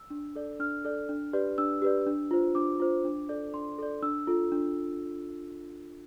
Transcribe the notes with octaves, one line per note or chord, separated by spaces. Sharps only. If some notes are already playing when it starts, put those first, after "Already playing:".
Already playing: E6
D4
A4 D5
D4 F6
A4 D5
D4
G4 B4 D5
D4 E6
G4 B4 D5
D4
F4 C5
D4 D6
F4 C5
D4
A4 D5
D4 C6
A4 D5
D4 E6
F4 A4
D4